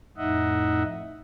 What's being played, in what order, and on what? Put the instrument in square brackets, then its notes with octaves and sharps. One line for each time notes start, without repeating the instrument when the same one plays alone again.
[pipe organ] F2 A2 D#4 D#5 E5 F#5